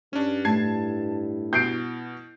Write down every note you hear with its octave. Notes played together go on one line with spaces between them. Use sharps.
G2 C#4 D4
A2 A5 G#6 C7
B2 G6 C7 D7